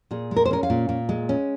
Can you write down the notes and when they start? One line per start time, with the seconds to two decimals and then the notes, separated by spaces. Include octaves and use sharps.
0.11 A#2 G#4
0.31 G#3
0.36 A#4
0.45 C5
0.51 C#4 A#4
0.63 F5
0.70 A#2
0.89 A#2
1.09 G#3
1.29 C#4